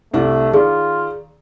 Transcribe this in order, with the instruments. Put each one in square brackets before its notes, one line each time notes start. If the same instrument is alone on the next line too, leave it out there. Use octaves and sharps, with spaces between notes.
[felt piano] C2 D4 E4 [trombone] A3
[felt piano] D#3 [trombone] F4 [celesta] G#4 D5